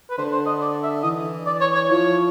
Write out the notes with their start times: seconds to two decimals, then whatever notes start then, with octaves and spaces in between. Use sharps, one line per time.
0.10 B4
0.18 D3 C5
0.32 C5
0.46 D#5
0.61 D5
0.83 E5
1.03 E3 D#5
1.46 D5
1.61 C#5
1.75 C#5
1.90 F3 C#5